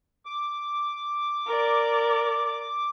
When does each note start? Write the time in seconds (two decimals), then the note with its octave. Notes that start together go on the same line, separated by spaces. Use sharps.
0.26 D6
1.47 A#4 D5